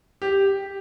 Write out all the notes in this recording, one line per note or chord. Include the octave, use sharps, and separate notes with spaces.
G4